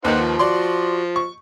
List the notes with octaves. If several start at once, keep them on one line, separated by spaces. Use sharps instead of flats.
D#2 D#3 D#4 B4 C5 F#5
F3
F#4 D5 C6
C#6